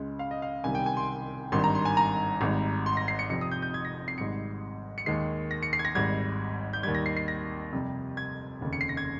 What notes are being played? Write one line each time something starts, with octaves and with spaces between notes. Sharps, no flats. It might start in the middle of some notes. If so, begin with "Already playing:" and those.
Already playing: C#2 C#3 G#3
F5
D#5
F5
C2 C3 D#3 G3 G#5
G5
G#5
C6
G#1 G2 D#3 G3 C6
A#5
C6
G#5
A#5
G#1 G#2 G3
C6
A#6
C7
C#7
F2 C3 F3 C#7
D#6
G6
G6
G#6
A#6
C7
G#1 G#2 G3 C#7
C#7
D#2 D#3 G#3 C7
A#6
C#7
C7
G#6
A#6
G#1 G#2 G3 G#6
G6
D#2 D#3 G3 G#6
A#6
C7
C7
A#6
F2 C3 G3
G#6
F1 D#2 C#3
C#7
C7
A#6
G#6